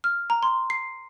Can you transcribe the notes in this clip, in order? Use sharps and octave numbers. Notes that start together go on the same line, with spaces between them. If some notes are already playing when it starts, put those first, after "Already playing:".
F6
A#5
C6
C7